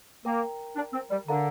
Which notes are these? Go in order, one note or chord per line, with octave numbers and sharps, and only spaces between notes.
A#3 A#4 G5 A#5
D4
C4
G3
D3 D4 A#4 F5 A#5